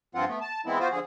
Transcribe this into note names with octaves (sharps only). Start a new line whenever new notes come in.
G2 F3 C4 F4 F#5
A3 B3
A5
E3 G#3 B3 C4 E4
B3 F4 F#4 C5
D3 F3 G#4